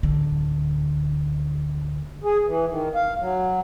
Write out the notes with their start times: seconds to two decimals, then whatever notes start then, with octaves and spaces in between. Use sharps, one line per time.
0.03 D1 D3
2.24 G#4
2.46 E3
2.70 D#3
2.95 F5
3.20 F#3